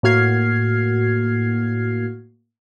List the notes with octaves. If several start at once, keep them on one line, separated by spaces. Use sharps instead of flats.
A2 A#3 F#4 F6 G#6 C7